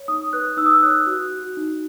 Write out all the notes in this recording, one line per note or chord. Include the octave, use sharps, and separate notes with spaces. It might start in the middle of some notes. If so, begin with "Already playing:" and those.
Already playing: C#5
D#4 D#6
B4 F#6
D#4 E6
D#6
E6
C#5 F#6
F#4
F#4
D#4